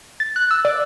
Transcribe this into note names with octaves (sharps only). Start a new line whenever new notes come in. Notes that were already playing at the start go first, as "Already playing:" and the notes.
A6
F#6
E6
D5